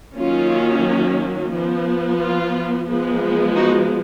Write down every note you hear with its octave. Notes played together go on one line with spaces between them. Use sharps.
D#3 F#3 A#3 C#4 F4
F3 B3
F4
F3 G#3 B3
D#4 F#4